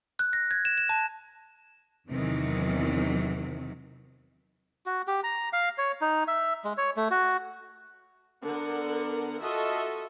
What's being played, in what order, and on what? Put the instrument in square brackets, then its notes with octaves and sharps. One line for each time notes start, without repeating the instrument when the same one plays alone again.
[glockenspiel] F#6
A#6
G#6
E7
E7
A5
[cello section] E2 C3 D#3 E3 F#3
[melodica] F#4
G4
A#5
F5
C#5
D#4
E5
G#3
C#5
A3
F#4
[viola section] D3 B3 A#4 F#5
F4 F#4 A4 D#5 E5